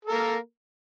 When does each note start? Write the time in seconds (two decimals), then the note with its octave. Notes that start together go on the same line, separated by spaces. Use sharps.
0.05 A4
0.08 A#4
0.12 A#3